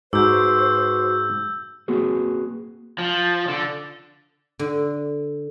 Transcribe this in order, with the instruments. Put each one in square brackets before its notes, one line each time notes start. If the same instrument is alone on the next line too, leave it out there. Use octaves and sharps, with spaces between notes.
[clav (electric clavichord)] G#2 [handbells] F#4 D6 [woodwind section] B4 C5 [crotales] E6 G6
[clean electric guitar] A#3 C4 F#4 G#4 B4
[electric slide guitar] F3
D3
[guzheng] D3